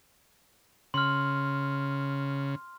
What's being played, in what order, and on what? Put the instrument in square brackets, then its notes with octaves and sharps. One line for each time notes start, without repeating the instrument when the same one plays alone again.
[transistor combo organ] C#3 [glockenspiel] C6 F6